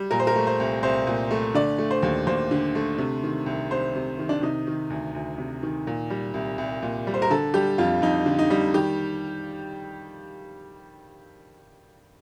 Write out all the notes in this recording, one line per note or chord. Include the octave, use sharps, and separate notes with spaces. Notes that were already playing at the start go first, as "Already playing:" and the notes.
Already playing: G3
A#2 A#4
C5
A#4
A3
C5
C2
C2 C5
A#2
A3
D3 D5
A3
C5
D#2
D#2 C5
D3
A3
C3
D#3
C2
C2 C5
C3
D#3
D4
C3 D#4
D#3
D2
D2
C3
D#3
A#2
G3
C2
C2
A#2
G3
C5
A#4
D3 A4
G3 G4
F2 F4
F2 D#4
D3
D#4
G3
D#3 G4